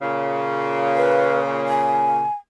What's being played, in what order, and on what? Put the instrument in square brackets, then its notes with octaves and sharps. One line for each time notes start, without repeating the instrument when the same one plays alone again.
[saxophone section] A#2 C#3
[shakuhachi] B4
G#5